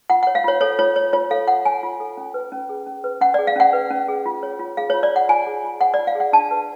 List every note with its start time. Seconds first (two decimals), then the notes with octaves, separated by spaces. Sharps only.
0.10 F4 F#5
0.23 C#5 F#5
0.35 F5
0.44 F4 C#5
0.61 A4 C#5
0.79 F4 C#5
0.96 C#5
1.13 F4 C#5
1.31 A4 F5
1.48 F4 F#5
1.65 C#5 G#5
1.83 F4
2.00 A4
2.17 C#4
2.34 B4
2.52 C#4
2.69 G#4
2.87 C#4
3.04 B4
3.21 C#4 F#5
3.34 G#4 D5
3.47 F5
3.56 C#4 F#5
3.73 B4
3.90 C#4
4.08 G#4
4.26 F4
4.43 C#5
4.59 F4
4.77 G#4 F5
4.90 F4 C#5
5.03 D5
5.12 C#5 F#5
5.29 F4 G#5
5.47 G#4
5.64 F4
5.81 C#5 F#5
5.94 D5
5.99 F4
6.07 F5
6.15 G#4 F#5
6.33 D4 A5
6.51 B4